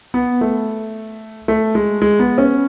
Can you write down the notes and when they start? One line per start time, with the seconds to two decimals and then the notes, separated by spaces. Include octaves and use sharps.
0.14 B3
0.41 A3
1.48 A3
1.75 G#3
2.02 G#3
2.19 B3
2.38 C#4